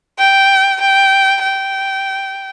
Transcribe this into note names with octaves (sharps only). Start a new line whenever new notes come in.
G5
G5
G5